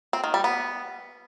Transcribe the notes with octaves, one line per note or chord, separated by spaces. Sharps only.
C4
D#3
G3
B3